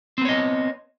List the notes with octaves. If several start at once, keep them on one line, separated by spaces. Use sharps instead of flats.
B3 C4 C#5 D#5